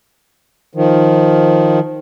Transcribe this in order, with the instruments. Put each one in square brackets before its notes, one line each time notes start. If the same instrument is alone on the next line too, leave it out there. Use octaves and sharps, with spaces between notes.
[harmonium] D#3 F3